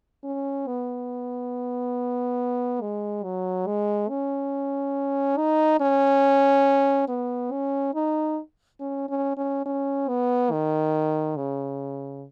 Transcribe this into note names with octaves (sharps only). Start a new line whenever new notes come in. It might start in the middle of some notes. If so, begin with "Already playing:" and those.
C#4
B3
G#3
F#3
G#3
C#4
D#4
C#4
B3
C#4
D#4
C#4
C#4
C#4
C#4
B3
D#3
C#3